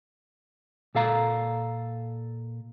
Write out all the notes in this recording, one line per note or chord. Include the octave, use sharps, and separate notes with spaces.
A#2 A4 F5 A#5